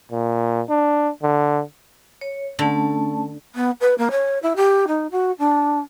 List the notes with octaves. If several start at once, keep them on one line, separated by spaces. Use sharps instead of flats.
A#2
D4
D3
C#5
D3 A3 C#4 A5
B3
B4
A#3
C#5
E4
G4
D#4
F#4
D4